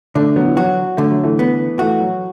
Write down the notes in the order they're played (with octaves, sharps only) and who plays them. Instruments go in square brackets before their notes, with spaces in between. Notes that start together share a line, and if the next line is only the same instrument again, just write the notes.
[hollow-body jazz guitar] D3 [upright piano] A3 D4
[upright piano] F#3 B3
E3
[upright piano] F#3 [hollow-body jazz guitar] F#4
[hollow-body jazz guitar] D3 [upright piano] A3
[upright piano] F#3
E3 A3
[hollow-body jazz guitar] B3
[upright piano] E3 A3 [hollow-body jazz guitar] F#4
[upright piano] F#3